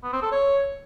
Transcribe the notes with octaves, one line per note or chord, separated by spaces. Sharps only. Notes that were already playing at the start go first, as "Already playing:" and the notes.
B3
C4
A4
C#5